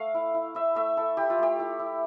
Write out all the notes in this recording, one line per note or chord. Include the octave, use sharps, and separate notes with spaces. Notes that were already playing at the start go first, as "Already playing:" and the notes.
Already playing: A3 F5
E4
E4
E4 E5
A3 E5
E4 A4
E4 G4
F4
A3 G4
E4
E4